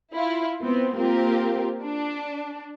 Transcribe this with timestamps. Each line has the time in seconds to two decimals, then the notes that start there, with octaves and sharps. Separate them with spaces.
0.13 E4 F4
0.61 B3 C4
0.95 A#3 C4 F4 G4 A#4
1.83 D4